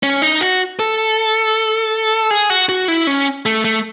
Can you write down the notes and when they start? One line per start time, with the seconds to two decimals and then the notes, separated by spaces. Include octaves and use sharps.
0.03 C#4
0.22 D#4
0.41 F#4
0.79 A4
2.31 G#4
2.50 F#4
2.69 F#4
2.88 E4
3.07 C#4
3.46 A3
3.65 A3